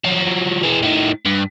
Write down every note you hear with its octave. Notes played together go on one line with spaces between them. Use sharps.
F3 F#3
E3 G#3
A2 D#3
G2